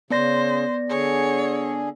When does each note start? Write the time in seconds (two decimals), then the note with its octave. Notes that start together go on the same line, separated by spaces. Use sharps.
0.10 C#3 B3 C5 D5 A#6
0.89 D3 G#4 C#5